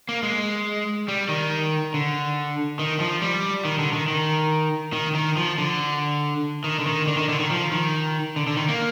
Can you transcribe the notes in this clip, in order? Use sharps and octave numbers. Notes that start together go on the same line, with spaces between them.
A#3
G#3
G3
D#3
D3
D#3
F3
G3
D#3
D3
D#3
D#3
D#3
D#3
F3
D3
D#3
D3
D#3
D3
D#3
D3
D#3
F3
D#3
D3
D3
D#3
A#3